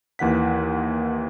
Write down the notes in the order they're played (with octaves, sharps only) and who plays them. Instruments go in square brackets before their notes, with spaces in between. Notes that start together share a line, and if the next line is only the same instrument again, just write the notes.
[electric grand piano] D#2 E3 F#5 B6